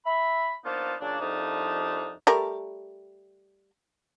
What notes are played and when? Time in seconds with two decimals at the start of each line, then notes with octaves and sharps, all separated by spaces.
0.06 E5 B5
0.64 F3 A#3 B3 D4 D#4 F4
1.00 A#2 C#3 F#3 D4
1.20 C2 F2 F3 D4 D#4
2.27 G3 A3 A#4